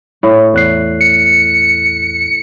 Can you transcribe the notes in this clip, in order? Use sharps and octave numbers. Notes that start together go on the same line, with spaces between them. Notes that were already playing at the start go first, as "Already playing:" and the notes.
A2
E2 F#6 C7
C#7